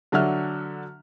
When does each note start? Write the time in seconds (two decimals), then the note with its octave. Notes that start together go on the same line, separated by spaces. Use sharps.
0.12 D3 F#3 D4 E5 F#5 F6